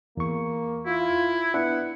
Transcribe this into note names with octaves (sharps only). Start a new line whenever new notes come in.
E2 A#3 C#6
E4 F4
B3 D4 E4 F#5